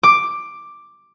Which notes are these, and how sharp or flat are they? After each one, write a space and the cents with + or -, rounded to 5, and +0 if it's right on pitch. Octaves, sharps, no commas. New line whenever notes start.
D6 +5